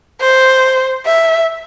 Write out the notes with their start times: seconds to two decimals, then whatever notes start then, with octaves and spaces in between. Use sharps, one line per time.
0.21 C5
1.07 E5